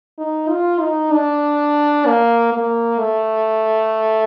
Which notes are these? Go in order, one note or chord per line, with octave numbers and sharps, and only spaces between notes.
D#4
F4
D#4
D4
A#3
A#3
A3